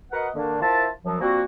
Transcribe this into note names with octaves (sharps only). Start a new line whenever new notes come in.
F#4 A#4 B4 D#5 F#5
D3 D#3 A#3 D4
E4 F4 A#4 C5 E5 A5
F#2 F3 F#3
F3 G3 A#3 C4 F#4